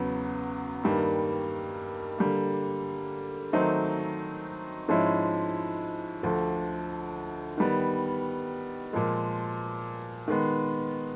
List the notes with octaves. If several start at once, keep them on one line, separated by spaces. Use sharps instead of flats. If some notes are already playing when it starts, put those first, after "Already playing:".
Already playing: E2 C#3 F#3 B3
G2 D#3 G3 A#3
D3 G3 A#3
D#3 F#3 A3 C4 D#4
G#2 F3 G#3 C#4 E4
D2 D3 F3
D#3 G3 B3
A#2 F3 G#3
D#3 G#3 B3